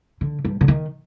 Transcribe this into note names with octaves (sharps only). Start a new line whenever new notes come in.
D3
G2
D3
D#3